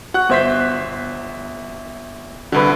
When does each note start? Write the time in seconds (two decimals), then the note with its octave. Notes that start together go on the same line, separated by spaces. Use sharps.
0.14 F#4 F#5 F#6
0.29 G1 B3 C5 E5 B6
2.52 C2 D3 F#4 B4